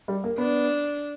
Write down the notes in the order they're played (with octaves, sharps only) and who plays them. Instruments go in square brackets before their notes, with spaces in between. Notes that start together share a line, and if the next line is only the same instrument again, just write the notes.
[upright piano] G3
A#3
[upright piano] B3 [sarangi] D4